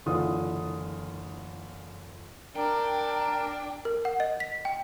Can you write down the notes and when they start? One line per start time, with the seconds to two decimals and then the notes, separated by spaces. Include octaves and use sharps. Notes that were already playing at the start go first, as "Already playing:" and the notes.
0.06 F#1 D3 E3 F4 D#6
2.56 D4 A#4 G5
3.85 A#4
4.05 F#5
4.20 D#5
4.40 B6
4.65 G5